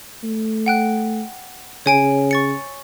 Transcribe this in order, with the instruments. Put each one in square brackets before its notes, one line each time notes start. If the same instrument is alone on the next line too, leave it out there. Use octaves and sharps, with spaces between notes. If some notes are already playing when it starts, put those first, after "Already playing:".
[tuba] A3
[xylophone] F#5 G5 F#6
[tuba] C#3 [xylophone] C#5 G#5 D7
[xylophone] C#6 A6 C#7